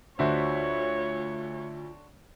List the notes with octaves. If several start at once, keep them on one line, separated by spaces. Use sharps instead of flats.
D2 D4 F4 F#4 C5 C#5 E5